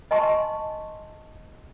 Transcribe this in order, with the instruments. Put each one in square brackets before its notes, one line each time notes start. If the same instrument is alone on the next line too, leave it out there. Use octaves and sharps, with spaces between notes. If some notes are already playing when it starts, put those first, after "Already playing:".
[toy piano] D#5 G#5 A5 C6 C#6